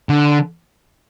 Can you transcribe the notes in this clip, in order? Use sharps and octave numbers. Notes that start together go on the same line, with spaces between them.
D3